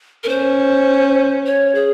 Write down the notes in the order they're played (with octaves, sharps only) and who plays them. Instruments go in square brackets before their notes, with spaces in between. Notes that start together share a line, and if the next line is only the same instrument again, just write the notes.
[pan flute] A#4
[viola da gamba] C#4 [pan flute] C5
[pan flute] C#5
G#4